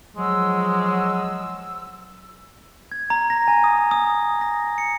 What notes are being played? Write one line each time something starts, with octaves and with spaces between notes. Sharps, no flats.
F3 F#3 G#3 E6
G#6
A#5
A#6
G#5
D#6
D#6
A#6
C#7